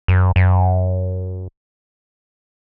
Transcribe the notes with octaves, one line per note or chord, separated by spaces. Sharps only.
F#2
F#2